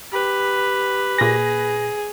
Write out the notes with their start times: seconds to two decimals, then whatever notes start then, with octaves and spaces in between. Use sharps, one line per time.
0.12 G4 B4
1.18 A#2 G#4 A#6